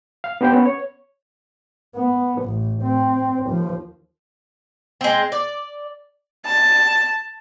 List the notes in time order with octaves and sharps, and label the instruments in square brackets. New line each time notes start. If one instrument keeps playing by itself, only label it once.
[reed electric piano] F5
B3 D4 G4 C5 G5
B3 C#4
C#5
[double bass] B3
A1
C4
D#2 F3
[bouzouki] G#3 C4
D5
[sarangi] A5